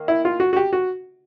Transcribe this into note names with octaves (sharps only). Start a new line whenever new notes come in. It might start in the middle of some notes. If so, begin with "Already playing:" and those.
Already playing: D#3 A#3
E4
F4
F#4
F#4
G4
F#4